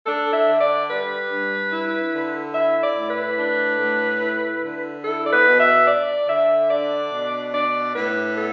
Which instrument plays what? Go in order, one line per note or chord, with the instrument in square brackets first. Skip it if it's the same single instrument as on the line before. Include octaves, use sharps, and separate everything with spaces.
[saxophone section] D4 A4
E5
D3
D5
G3 B4
G2
E4
D3
E4 E5
D5
A2
B4
D4
A2
E4
D3
E4 A4
D5
B4
B2
E5
D4 D5
D3 E5
D4 D5
B2
D4 D5
A2 B4
B3 A4